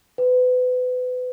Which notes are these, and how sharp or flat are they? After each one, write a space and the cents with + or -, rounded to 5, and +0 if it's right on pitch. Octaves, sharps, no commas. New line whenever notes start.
B4 +30